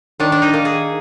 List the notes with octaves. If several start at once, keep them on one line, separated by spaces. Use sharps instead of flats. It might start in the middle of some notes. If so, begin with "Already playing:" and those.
D#3 D4
D4
D#4
A#3
G#4